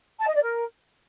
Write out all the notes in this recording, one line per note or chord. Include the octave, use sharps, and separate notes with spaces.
A5
D#5
D5
A#4